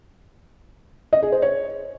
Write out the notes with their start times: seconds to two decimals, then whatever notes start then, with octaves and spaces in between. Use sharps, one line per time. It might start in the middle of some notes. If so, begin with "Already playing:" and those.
1.13 D#5
1.23 G#4
1.32 C5
1.42 C#5